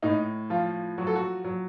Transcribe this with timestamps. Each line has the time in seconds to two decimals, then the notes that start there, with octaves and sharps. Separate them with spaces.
0.02 A2 D#4
0.50 F3 F4
0.98 F#3 F#4
1.07 A4
1.16 F#4
1.44 F#3